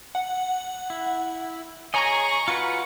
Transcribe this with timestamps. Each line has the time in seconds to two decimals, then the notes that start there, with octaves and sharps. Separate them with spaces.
0.15 F#5
0.90 E4
1.94 G#4 C#5 D#5 G#5 A#5 C#6
2.48 F4 F#4 B4 C#7